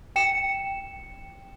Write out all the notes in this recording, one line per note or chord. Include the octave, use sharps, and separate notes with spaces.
G5 C#7 E7